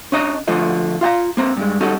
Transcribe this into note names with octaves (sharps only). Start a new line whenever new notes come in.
C#4 D4 D#5 A#5
D3 F3 A3 F4 D#5
F4 F5 G5 A#5
A#3 C4 A#5
G2 G#3
G3 C#4 D#4 F#4 A4